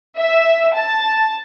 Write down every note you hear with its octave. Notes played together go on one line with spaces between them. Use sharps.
E5
A5